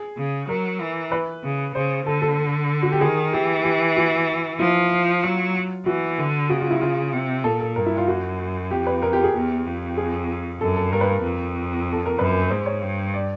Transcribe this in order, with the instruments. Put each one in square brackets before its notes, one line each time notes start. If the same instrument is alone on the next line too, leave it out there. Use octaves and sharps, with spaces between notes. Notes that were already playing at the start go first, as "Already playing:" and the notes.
Already playing: [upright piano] G#4
[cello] C#3
[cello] F#3 [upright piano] A#4
[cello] E3
[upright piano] B4
[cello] C#3
[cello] C#3 [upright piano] C5
[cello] D3 [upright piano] A4
[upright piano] A4
F#4
G4
[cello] D#3 [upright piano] G#4
[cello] E3 [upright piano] G4
[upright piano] G4
F#4
[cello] F3 [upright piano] E4
[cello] F#3 [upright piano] F4
[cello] E3 [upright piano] F#4
[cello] D3
[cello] C#3 [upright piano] F#4
[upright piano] F4
E4
F4
[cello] C3
[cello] A#2 [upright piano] A4
[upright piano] A4
[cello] G2 [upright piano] A#4
[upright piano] E4
F4
[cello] F#2 [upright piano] F#4
[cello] F2 [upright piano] G4
[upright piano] B4
A#4
G4
G#4
[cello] E2 [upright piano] G4
[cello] F2
[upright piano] G#4
[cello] F#2 [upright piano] A4
[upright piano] A4
[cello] G2 [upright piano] A#4
[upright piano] B4
A#4
[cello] F2
[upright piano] A4
A#4
[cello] F#2 [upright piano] B4
[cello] G#2 [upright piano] C5
[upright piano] C#5
[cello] G2
[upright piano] D5